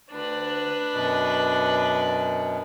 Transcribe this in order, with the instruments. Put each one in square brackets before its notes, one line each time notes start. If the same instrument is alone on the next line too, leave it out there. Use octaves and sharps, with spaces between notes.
[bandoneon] D2 [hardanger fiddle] D4 B4
[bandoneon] F#2 B2